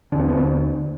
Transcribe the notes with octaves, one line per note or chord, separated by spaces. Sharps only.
D#2 D3 D4
C4
B3
C4